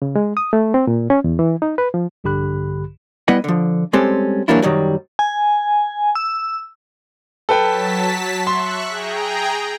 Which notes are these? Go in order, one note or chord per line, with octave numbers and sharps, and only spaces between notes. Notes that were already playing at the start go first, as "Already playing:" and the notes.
C#3
G#3
D#6
A3
C4
A#2
C#4
E2
E3
D#4
B4
F3
A#1 G2 D3 G4 B5 F#6
G3 B3 E4 B4 D#5 F#5
D3 F3
G3 G#3 C4 C#4 G4 A4
E3 F#3 G3 A#3 D4 E4
F#2 A2 D#3 F#3 G3
G#5
E6
F#3 A4 B4 G5 A5 B6
E5 C6 C#6 F#6
G#4 G5 A#5